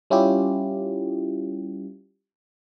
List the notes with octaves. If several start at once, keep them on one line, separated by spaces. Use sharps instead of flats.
G3 C#4 E4 F4 G4